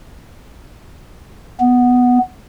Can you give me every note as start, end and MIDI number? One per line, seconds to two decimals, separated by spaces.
1.60 2.19 59